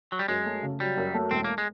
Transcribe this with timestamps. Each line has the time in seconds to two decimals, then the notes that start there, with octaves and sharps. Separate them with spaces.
0.12 F#3
0.19 G3
0.28 F#2 G#3
0.45 A3
0.62 C#3
0.80 F#3 G3
0.97 F#2
1.14 A3
1.31 E1 C4
1.44 A#3
1.58 G#3